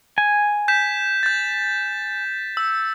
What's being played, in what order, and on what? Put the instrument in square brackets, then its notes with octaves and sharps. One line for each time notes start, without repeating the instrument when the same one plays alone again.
[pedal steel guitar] G#5
[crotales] G6 B6 E7
G6 A6
E6